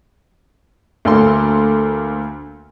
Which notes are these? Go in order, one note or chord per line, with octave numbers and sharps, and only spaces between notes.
D2 A#3 A4 C6